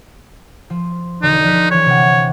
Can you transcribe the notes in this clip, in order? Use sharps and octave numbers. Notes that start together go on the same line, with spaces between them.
F3
E1 D3 D#4 D5
F3 F#6 B6
E3 G4 C#5
C3 F#5